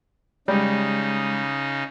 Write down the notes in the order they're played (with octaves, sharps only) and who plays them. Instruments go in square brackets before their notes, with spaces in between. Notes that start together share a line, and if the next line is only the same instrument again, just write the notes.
[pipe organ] C#3 D#4 [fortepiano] G3 [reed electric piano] G#3